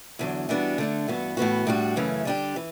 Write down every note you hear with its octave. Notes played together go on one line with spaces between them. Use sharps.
E2 D3 F#3
E3 G3 B3 D4 F#4
D3 A3 D4
G2 E3 B3 F#4
A2 E3 B3 F#4
A2 G3 D4 F#4
F#2 C#3 E3 A3 C#4
D3 G3 D4 G4
E3